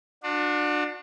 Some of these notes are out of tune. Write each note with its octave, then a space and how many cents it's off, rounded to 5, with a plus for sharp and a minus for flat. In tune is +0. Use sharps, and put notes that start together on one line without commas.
D4 +20 F#4 -35